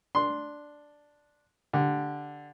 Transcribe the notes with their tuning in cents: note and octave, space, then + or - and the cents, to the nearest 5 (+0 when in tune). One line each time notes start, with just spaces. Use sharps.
D4 +0 C6 +0
D3 +0 G4 +0